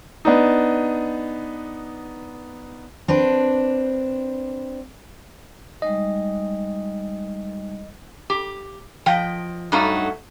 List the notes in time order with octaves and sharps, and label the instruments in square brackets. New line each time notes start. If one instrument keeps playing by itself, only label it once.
[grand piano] B3 D4 D#4
[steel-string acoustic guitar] C4 D4 B4
[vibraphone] G3 G#3 D#4 [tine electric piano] D#5
[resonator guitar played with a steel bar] G4
F3 D#5 G5
G2 F#3 A3 D#4 F#4